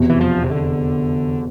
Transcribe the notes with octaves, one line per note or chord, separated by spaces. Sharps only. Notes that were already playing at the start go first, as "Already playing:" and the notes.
Already playing: F1 E2 B2
E3
F3
C3
D3